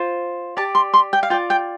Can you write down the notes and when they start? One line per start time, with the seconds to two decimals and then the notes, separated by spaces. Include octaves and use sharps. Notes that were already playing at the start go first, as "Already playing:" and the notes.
Already playing: F4 C5
0.57 G4 D5 A5
0.75 C6
0.94 C6
1.13 G5
1.23 F5
1.30 F4 D5 G5
1.50 G5